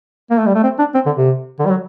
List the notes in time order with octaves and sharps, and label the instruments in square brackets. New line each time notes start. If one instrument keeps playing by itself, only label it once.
[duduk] A#3
A3
G3
A3
C4
D4
C4
D3
C3
D3
G3
F#3